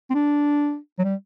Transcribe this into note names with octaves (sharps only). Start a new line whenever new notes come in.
C4
D4
F#3
G3